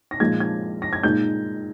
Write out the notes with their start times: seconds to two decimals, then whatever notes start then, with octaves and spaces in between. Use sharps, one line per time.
0.11 A#6
0.20 A#2 F3 G#3 D#4 G#6
0.40 G#6
0.82 A#6
0.93 G#6
1.03 A#2 G#3 D#4 G6